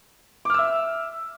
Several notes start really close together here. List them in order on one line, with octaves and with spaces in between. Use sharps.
D6 F6 E6 E5